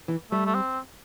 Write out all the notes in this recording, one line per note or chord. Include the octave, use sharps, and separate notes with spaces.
E3
G3 A3
A3
C4